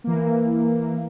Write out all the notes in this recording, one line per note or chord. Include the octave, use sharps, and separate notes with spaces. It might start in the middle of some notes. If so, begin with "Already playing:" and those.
E3 A#3